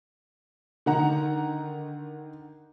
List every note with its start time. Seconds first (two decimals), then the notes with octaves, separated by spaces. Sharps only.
0.86 D3 D#3 F#5 A#5